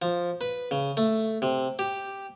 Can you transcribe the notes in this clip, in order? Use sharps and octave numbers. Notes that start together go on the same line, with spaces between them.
F3
B4
C#3
A3
C3
G4